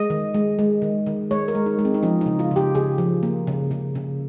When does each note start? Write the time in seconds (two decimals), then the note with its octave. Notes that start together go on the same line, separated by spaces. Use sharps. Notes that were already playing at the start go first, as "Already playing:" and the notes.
Already playing: G#3 D#5
0.10 D#3
0.34 G#3
0.59 G#3
0.82 D#3
1.06 D#3
1.31 G#3 C#5
1.48 A#4
1.55 G#3
1.66 D#4
1.79 G#3
1.85 C4
1.94 D#4
2.03 F3 C#4
2.21 D#4
2.26 C#3
2.39 F4
2.51 C#3
2.56 G4
2.75 C#3 G#4
2.98 F3
3.23 A#3
3.47 C#3
3.71 C#3
3.95 C#3